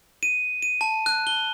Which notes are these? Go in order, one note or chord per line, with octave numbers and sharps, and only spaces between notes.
D#7
D#7
A5
F#6
G7